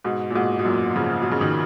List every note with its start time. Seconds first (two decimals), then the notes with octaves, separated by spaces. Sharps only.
0.04 G#2 B2
0.30 A#2
0.35 G#2 B2
0.59 B2
0.65 F#2 A#2
0.96 C#3 F3
1.22 B2
1.31 C#3
1.41 B2 D#3